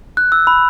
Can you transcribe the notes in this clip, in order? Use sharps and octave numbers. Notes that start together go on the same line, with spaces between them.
F#6
E6
B5